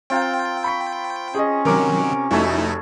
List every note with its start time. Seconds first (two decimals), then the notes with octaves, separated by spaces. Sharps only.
0.10 C4 F4 G5 A#5
0.64 B5 C#6 B6
1.35 C#4 G#4 D#5
1.65 C3 D#3 F#3 A#4 D6
2.31 F1 A3 D#4 E4 F#4 G#4 A4 E5